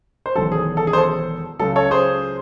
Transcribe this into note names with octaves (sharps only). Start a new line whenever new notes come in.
C5
E1 E2 D#3 F#3 A4
G#4
A4
G#4
C5
A4
C#2 C#3 F#3 A4
A4 C#5
G#4 C5